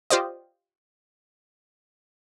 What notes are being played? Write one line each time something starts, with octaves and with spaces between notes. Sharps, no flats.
F4 G4 C5 D5 D#5